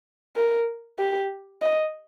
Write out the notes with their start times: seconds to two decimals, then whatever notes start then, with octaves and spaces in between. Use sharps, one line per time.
0.36 A#4
0.99 G4
1.62 D#5